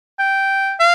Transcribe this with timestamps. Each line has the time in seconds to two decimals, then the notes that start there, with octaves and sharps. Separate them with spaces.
0.19 G5
0.80 F5